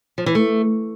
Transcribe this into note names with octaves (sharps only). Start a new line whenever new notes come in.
F3
E3
A3